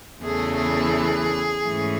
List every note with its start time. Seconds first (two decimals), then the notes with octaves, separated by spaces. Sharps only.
0.21 E2 C#3 E3 A3 G#4
0.56 G#4
1.63 G#2 E3 A3 C#4